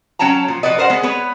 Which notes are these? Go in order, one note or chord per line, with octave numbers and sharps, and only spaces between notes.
F#3 C#4 G5 A5 A#5
A#2 F3
F3 F#4 B4 D5 D#5
A#4 C5 D5 F#5
G#3 B3
B3 B4 C#5